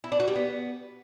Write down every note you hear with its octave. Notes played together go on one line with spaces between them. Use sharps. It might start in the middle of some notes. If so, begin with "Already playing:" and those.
E4
D4
F#4
G3
B3